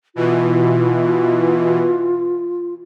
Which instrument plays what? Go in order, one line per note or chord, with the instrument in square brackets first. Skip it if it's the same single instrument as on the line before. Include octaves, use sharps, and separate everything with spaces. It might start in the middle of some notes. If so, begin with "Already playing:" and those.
[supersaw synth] B2 E3 [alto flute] F4